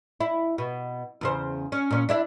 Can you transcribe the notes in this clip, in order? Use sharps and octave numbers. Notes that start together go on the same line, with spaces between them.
E4
B2
E2 C#3 C5
C#4
A#2 C#4
D4 E4 E5